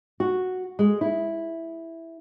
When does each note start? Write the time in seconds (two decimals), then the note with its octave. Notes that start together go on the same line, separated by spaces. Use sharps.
0.20 F#4
0.79 G#3
1.01 E4